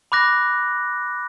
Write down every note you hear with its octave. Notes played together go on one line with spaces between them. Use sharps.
B5 D6 F#6 A#6